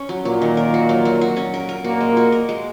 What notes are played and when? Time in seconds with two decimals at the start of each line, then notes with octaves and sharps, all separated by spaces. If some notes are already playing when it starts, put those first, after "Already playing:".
Already playing: C#4
0.09 F#3
0.25 A#2 F#3 A#3
0.42 D#3
0.57 A#4
0.74 F#4
0.89 F#3
1.05 F#3
1.21 F#4
1.36 C#4
1.54 A#4
1.69 A#4
1.84 A#2 A#3 F#4
2.00 G#3
2.17 F#4
2.32 A#4
2.49 G#3